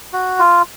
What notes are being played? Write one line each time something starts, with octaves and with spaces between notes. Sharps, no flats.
F#4
F4